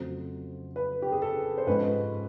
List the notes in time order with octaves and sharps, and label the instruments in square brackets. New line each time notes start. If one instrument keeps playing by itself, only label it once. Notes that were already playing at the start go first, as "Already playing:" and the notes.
Already playing: [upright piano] F2 C#3 F#3 A3 C5
B4
G4
G#4
A4
C5
G#2 F3 G#3 C#4 B4